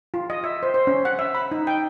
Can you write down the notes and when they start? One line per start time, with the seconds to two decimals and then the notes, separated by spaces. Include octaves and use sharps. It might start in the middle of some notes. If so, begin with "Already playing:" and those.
0.14 F4
0.30 D#5
0.44 E5
0.63 C5
0.74 C5
0.87 C#4
1.05 F#5
1.19 E5
1.35 B5
1.51 D#4
1.67 G5